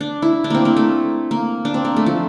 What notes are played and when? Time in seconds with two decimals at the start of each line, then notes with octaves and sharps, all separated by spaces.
0.01 D4
0.22 E4
0.44 D4
0.50 A#3 C4
0.65 A#3
0.77 A3
1.31 A#3
1.65 D4
1.74 C4
1.85 A#3
1.96 A3
2.06 F3